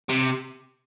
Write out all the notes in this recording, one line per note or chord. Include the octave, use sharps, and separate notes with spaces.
C3